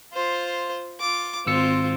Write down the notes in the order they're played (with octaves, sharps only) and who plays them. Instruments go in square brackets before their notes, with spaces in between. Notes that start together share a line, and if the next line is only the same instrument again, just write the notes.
[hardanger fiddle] F4 C5
F4 D6
[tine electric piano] G#1 E6 C#7 [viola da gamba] C4 [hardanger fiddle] F4